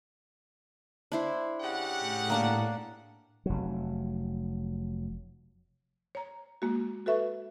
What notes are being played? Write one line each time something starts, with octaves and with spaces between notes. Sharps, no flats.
D4 E4 C5
C#3 G4 F#5
A2
A#3 D4 A5
F1 F#3
C#5 A#5
G#3 A#3 F#4
F#4 A4 B4 E5 C#6